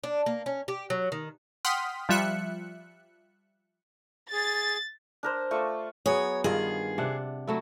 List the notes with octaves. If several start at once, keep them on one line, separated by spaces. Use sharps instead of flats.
D4
A#3
C#4
G4
F#3
D#3
F#5 G5 C6 D#6 F6 B6
F3 G3 F4 E5 F#6 C#7
G#4 A6
D4 A#4 C5
A3 F4 D5 C#6
F#3 B3 G#4 C#5
G2 D#3 F4 G#4
C3 D4 F#5
F#3 A3 E4